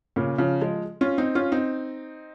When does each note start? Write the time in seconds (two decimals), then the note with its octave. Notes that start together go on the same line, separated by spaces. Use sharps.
0.16 A#2 C#3
0.38 C#3 F3
0.61 F3 G#3
1.01 C#4 F4
1.18 C4 D#4
1.35 C#4 F4
1.52 C4 D#4